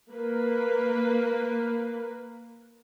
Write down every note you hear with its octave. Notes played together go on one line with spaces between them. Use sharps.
A#3 A#4 B4